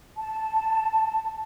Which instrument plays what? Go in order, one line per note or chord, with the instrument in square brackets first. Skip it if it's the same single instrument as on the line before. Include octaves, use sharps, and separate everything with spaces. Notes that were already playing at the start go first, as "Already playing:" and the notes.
[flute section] A5